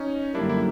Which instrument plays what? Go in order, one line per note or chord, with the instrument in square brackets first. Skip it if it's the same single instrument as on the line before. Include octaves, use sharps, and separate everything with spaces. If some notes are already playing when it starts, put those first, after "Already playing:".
Already playing: [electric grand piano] C#4 D#4
[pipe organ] F#2 D3 G3 A#3 [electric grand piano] D4 E4
[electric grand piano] E4